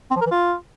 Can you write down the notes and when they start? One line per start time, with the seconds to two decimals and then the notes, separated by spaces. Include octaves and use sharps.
0.11 C4
0.16 F3
0.21 A#4
0.26 E3
0.31 F4